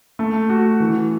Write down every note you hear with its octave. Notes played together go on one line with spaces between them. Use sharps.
A3
F#4
E3